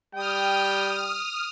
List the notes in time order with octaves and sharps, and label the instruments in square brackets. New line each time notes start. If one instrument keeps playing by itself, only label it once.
[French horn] G3 [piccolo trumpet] G5 [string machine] D#6 F6